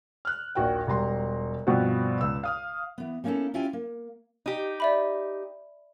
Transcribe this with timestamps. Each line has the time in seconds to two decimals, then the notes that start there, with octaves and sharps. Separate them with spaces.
0.25 F6 F#6
0.55 A#1 D#2 F#4 A#4 G5
0.87 E1 G3 A#5 C6
1.67 G2 B2 F3 B3 C4 F#4
2.21 C#2 E6
2.43 F5 D#6 F6
2.98 E3 B3
3.24 G3 A#3 C#4 D#4 E4 A4
3.54 C#4 E4 F4 G4 G5 G#5
3.73 A#3
4.46 D#4 G4
4.80 D5 E5 B5